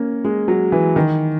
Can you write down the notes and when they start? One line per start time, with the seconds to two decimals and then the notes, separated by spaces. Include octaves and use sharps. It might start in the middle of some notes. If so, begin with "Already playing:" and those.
Already playing: A#3 C#4
0.24 G#3
0.48 F#3
0.72 E3
0.96 D#3